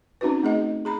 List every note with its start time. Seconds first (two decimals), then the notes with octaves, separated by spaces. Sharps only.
0.21 C4 C#4 D#4 F#4 B4
0.43 A3 G#4 D#5
0.85 G#4 A#5 B5